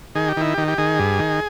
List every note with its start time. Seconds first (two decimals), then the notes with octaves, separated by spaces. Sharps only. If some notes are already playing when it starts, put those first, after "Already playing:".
0.15 D#3 G#4
0.28 G4
0.37 D#3 E4
0.54 D#3 G4
0.68 G4
0.78 D#3 G#4
0.99 G2
1.19 D#3